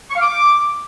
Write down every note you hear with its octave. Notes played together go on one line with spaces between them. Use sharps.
C#6
F5
D6